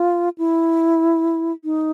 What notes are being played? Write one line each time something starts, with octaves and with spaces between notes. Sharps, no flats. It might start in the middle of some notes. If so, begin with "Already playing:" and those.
Already playing: F4
E4
D#4